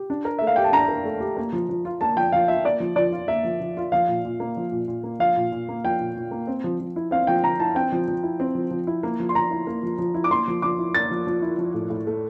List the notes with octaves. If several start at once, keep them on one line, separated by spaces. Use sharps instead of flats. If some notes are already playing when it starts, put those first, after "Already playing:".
Already playing: G4
D4
A#4
A3 E5
F5
G4 G5
A5
D4 A#5
A#4
A3
G4
A#3
F3
F3
F4
A#3 A5
F3 G5
F3 F5
F4 E5
A#3 D5
F3
F3 D5
F4
A#3 E5
F3
F3
F4
F3 F5
A#2
A#2
A#3
F3
A#2
A#2
A#3
F3 F5
A#2
A#2
A#3
F3 G5
A#2
A#2
A#3
C4
F3
F3
E4
C4 F5
F3 G5
F3 A#5
E4 A5
C4 G5
F3
F3
E4
C4
F3
F3
E4
A#3
F3
C6
F3 A#5
E4
A#3
F3
F3
E4
D6
A#3 C6
F3
F3 D6
E4
A#3 A6
F3
F3
E4
F3
A2
A2
A3